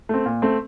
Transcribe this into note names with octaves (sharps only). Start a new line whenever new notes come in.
A3 C4
A#2
A3 C4